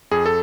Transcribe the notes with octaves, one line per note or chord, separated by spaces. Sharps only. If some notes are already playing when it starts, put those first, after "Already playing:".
F2 G#4
A4